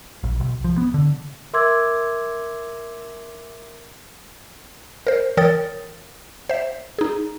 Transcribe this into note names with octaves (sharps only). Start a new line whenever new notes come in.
A#1
B1
F3
B3
D3
A#4 E5 C6 D6 E6 G#6
A#4 C5
E3 A#4 C#5 G5 D#6 A6
C5 E5
D#4 G#4